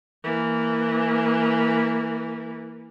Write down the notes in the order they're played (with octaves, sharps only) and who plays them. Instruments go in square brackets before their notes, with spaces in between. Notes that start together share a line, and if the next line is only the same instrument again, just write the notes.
[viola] E3 A#3